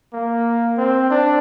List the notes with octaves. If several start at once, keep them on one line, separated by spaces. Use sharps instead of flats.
A#3
C4
D4